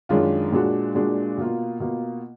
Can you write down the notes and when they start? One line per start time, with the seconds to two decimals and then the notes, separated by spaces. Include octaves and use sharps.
0.09 F#2 D#3 G#3 D4 F4
0.52 A#2 G#3 D4 F#4
0.95 A#2 G#3 D4 F#4
1.38 B2 A#3 F4
1.80 B2 A#3 F4